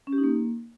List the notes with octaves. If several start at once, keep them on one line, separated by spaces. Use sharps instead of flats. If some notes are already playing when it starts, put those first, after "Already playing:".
C#4
G4
D#4
A#3